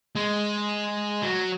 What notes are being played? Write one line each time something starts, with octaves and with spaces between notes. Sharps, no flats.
G#3
F#3